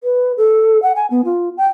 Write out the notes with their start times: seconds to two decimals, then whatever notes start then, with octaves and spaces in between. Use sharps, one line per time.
0.04 B4
0.38 A4
0.82 F#5
0.96 G#5
1.11 B3
1.25 F4
1.57 G5